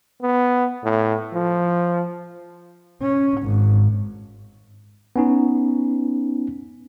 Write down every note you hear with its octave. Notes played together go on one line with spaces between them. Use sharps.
B3
A2
F3
C#4
G#1
B3 C#4 D#4